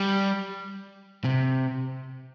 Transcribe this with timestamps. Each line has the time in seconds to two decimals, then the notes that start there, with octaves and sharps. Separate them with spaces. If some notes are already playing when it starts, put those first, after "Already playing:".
Already playing: G3
1.25 C3